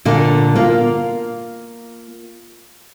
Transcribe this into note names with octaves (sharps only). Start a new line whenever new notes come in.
A#2 D3 A#3
A#3 F4